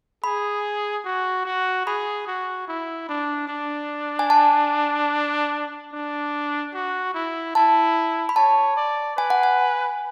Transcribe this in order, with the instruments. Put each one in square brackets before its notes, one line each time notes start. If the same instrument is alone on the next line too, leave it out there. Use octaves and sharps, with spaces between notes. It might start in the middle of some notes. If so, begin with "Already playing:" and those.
[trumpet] G#4 [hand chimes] B5
[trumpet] F#4
F#4
[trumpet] G#4 [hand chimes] B5
[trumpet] F#4
E4
D4
D4
[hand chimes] G#5
A5
[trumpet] D4
F#4
E4
[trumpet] E4 [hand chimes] A5
[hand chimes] B5
[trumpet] C#5 [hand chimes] A5
[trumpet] D5
[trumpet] B4 [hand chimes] G#5
[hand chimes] F#5
G#5